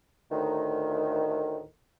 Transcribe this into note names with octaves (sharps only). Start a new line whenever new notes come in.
D2 A2 D#3